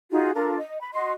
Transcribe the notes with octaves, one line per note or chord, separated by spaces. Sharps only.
D#4 F4 F#4 G#4
D4 F4 A4 A#4
D#5
B5
F#4 D#5 C6